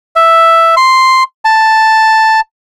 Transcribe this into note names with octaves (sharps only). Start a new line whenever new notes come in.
E5
C6
A5